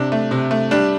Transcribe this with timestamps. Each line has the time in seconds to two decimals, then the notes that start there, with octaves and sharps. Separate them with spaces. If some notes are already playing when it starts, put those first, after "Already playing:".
Already playing: C3 D4
0.12 A3
0.31 C3
0.51 A3
0.71 G3 D4